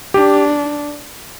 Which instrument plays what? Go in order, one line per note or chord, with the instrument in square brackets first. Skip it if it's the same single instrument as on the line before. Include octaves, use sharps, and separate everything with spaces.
[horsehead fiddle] D4 [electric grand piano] G4